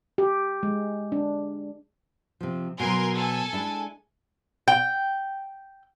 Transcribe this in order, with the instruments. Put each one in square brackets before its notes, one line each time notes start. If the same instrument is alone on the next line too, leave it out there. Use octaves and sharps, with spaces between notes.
[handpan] G4
G#3
D4
[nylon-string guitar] C3 F3
[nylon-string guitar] B2 F#3 [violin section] A#4 G#5 C6
[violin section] A4 G#5
[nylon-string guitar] G#3 D4 E4
[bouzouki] G5